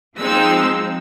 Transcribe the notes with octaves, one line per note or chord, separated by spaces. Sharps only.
F3 G#3 C4 D#4 E6